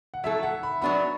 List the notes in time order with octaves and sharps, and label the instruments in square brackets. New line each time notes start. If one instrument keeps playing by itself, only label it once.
[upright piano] F#5
[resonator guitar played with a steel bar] F#3 A3 E4 A4 [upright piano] E5
[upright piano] F#5
B5
[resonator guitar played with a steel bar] F#3 B3 D4 F#4 [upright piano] B5